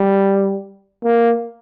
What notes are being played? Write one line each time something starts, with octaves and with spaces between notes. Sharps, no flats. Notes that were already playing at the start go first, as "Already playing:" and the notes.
Already playing: G3
A#3